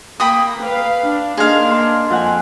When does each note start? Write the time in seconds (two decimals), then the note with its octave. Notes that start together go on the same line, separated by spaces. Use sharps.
0.20 A#3 G5 B5 D#6
0.62 B4 F5
1.02 D4
1.37 A#3 D4 D#4 G#4 F5 C6
1.70 C6
2.10 F2 F#5 G#5